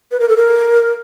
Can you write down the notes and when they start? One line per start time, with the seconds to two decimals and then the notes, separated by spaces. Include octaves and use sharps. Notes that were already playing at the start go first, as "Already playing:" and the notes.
0.11 B4
0.20 A#4
0.29 A4
0.37 A#4